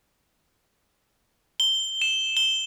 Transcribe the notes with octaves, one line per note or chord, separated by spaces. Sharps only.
G7
E7
G7